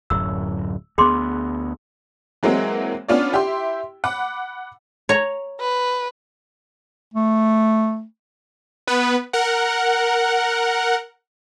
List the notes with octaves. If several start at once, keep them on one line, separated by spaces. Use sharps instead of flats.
D1 F#2 E6
D2 B3 G#4 C6 D6
E3 F#3 G#3 A#3 C4
B3 C#4 D4 F4 C#5 D5
E4 G4 E5 G5 C6
F#5 B5 D6
C#5 A#5
B4
A3
B3 B4
A#4 F#5